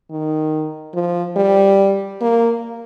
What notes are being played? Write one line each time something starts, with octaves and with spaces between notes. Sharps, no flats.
D#3
F3
G3
A#3